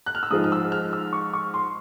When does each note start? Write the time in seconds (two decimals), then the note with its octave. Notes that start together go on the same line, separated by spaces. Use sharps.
0.06 F#6
0.15 F6
0.23 E6
0.31 G#2 F3 G#3 D#6
0.44 F6
0.52 E6
0.72 F6
0.93 E6
1.13 C#6
1.33 C#6
1.54 C6